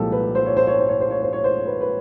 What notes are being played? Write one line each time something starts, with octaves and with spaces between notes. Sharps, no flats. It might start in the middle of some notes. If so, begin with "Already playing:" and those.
Already playing: C2 A#2 F3 G#3 G4 A4
B4
C5
C#5
C5
C#5
C5
C#5
C5
C#5
C5
C#5
C5
B4
B4